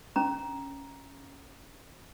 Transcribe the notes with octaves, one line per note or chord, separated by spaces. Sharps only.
C#4 A#5